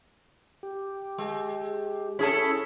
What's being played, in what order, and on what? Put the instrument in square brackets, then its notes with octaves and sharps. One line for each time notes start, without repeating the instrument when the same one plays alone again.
[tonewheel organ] G4
[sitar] G#3
[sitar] C#4 G#4 A4 [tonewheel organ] E4 C#5 B5